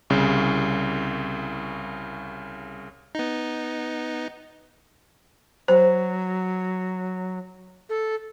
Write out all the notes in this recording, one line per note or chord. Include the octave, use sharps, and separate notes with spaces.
C2 C#3
B3 D#4
F#3 C5
A4